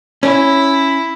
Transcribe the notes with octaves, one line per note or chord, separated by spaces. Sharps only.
C#4 E4